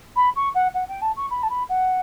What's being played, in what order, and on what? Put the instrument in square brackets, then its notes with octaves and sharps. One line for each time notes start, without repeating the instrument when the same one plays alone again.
[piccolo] B5
C#6
F#5
F#5
G5
A5
C#6
B5
A5
B5
F#5